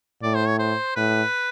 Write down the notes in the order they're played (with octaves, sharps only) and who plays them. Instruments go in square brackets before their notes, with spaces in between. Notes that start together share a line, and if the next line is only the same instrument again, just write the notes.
[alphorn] A2 [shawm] D5
[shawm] C5
C#5
C5
[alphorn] A2 [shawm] B4